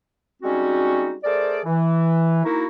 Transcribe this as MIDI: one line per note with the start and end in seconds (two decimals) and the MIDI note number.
0.42 1.15 55
0.42 1.15 56
0.42 1.15 60
0.42 1.15 61
0.42 1.15 63
0.42 1.15 66
1.23 1.60 57
1.23 1.60 68
1.23 1.60 70
1.23 1.60 72
1.23 1.60 74
1.65 2.43 52
2.44 2.66 58
2.44 2.66 63
2.44 2.66 64
2.44 2.66 66